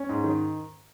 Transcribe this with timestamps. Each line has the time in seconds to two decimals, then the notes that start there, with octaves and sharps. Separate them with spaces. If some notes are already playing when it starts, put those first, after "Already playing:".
Already playing: C#4
0.09 G#2
0.24 D#3